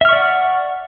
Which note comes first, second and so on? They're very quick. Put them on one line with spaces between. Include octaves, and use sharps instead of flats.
E5 F6 C#6 D5 F#5